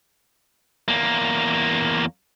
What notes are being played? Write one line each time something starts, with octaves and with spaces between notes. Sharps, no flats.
E2 A#3